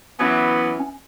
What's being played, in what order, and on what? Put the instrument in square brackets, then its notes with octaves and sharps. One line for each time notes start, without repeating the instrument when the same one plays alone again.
[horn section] E3 F#3 B3 [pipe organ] C#4